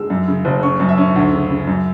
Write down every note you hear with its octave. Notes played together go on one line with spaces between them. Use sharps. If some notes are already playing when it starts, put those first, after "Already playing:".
Already playing: G#3 E6
F#2
C#3
F#1
C#4 C#6
F#2
E5
C#4
D2
C#3
C#3
F#2